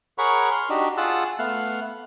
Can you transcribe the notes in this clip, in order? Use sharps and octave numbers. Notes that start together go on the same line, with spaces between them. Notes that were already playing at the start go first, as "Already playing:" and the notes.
G#4 A#4 C#5 F#5 B5 C#6
C6 F6
D4 D#4 F#4 G4
F4 G#4 F#5 A5 E6 F#6
A3 B3 F5 F#6